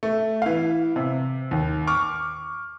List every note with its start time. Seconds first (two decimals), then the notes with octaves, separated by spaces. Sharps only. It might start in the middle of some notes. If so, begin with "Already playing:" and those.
0.03 A3
0.42 E3 F5
0.96 C3
1.51 D#2
1.87 C#6 D6 F6